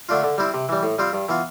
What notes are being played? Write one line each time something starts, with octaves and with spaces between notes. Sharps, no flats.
D3 A3 D4 F4
D3
G3 C4 E4
C3
E3 G3
A2
G3 C4 F4
G2
E3 B3 F4